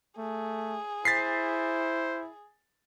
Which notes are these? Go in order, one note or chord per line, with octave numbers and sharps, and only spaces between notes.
A3 G#4
E4 C5 A6 B6 C7